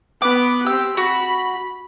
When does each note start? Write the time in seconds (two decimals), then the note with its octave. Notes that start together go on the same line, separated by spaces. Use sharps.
0.22 B3 B4 D6
0.67 C4 G4 E6
0.97 F#4 B5